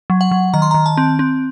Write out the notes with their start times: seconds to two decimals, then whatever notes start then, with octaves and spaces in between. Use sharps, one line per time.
0.10 F#3
0.21 F#5
0.31 F#3
0.54 D#3 A#5
0.62 C6
0.71 D#3 A#5
0.86 A5
0.97 C4
1.19 C4